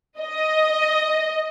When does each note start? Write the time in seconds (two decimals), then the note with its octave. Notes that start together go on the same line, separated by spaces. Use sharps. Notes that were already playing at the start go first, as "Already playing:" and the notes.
0.20 D#5